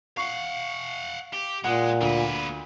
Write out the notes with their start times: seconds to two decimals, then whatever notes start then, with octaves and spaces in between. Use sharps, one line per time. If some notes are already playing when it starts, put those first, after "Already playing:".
0.17 F5 F#5 C#6
1.33 G4
1.64 A#2 G#3 F#5
2.01 D2 A#3 B4